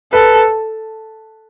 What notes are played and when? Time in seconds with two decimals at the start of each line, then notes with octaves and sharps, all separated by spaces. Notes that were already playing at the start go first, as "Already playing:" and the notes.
0.12 A4 B4